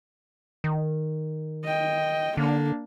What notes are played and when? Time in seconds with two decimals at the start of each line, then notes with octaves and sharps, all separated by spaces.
0.64 D#3
1.64 D#5 G5
2.37 D3 A#3 D4